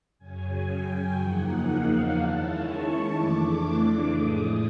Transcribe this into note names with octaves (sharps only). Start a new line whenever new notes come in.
F#2 C#3 F#3 G#5
G5
E2 C#3 F3 A#3 D#4 F#5
F5
D#3 G#3 C#4 E4 A5
C#6
F2 C#3 E3 A3 D4 D6
A2 F3 G#3 D#6